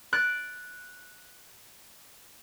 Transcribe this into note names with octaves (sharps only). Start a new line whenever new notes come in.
F#6 A6 D7